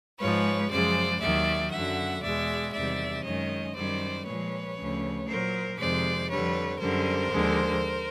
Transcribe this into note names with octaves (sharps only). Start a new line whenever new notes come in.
G#2 F3 G#3 B4 C#5
F#2 C#3 F3 G#3 C5 D5
D#2 D#3 F#3 D5 E5
F#2 D3 F#3 E5 F#5
E2 B2 G#3 D5 E5
E2 C3 D#3 G3 D5 E5
F#2 D#3 G#3 C#5 D#5
F#2 D#3 G3 C5 D5
A#2 F3 G#3 B4 C#5
D2 C#3 F3
A#2 F#3 A#4 C5
F2 C3 D#3 G#3 C5 D5
F2 D3 G3 B4 C#5
F#2 D3 G3 A#4 C5
D#2 D3 F3 G#3